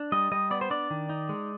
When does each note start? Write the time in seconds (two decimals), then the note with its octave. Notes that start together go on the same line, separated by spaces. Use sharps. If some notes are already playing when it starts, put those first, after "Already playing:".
Already playing: D4
0.12 G3 D#5
0.32 G3 D#5
0.51 B3 D5
0.61 C5
0.70 D4 D5
0.90 D#3
1.09 D#4
1.29 G#3